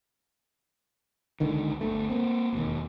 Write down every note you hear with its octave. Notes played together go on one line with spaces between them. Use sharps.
C#2 D3 D#3
G1 D2 A3
A#3 C4
E1 D#2